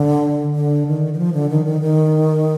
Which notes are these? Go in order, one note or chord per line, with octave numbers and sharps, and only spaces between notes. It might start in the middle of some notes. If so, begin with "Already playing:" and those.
Already playing: D3
D3
D#3
D#3
F3
D3
D#3
D#3
D#3